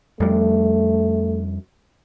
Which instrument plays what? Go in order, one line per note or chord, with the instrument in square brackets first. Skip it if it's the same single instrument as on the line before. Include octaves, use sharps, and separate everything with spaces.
[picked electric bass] F2 G3 [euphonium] A3